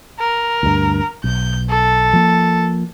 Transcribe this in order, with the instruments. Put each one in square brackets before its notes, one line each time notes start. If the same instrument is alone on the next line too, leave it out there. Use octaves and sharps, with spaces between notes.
[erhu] A#4
[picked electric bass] D2 G2
[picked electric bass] B1 [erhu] G6
[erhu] A4
[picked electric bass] F3 A#3